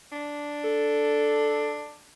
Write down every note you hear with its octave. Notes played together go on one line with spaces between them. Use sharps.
D4
A4